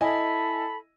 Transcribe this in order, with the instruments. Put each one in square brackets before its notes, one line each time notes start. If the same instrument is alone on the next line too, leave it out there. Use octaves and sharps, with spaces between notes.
[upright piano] E4 D#5 G#5 [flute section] A4 B5